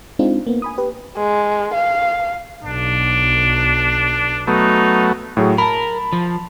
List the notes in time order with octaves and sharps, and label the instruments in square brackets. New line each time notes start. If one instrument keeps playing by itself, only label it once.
[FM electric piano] G#3 C4 D4 D#4 F4
A#3 B3
G#5 B5 D#6
G4 B4
[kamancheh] G#3
F5
[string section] B1 [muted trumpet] D4
[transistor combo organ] F#3 A3 B3 [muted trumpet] D#4
[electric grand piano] A2 F#3 G#4
[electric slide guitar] A#4 [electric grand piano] A5 B5
[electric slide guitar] F3